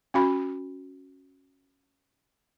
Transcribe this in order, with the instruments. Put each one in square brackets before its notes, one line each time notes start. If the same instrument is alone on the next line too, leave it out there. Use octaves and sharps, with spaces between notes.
[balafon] C#4 F#4 B5